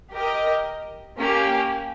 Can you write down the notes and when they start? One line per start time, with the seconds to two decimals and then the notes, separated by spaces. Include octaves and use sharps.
0.14 G4 A#4 D#5
1.19 A#3 C#4 G4